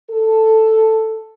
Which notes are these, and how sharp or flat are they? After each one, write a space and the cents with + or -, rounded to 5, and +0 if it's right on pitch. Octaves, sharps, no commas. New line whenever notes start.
A4 +5